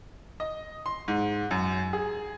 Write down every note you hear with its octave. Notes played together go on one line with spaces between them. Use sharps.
D#5
C6
G#2
F#2
G#4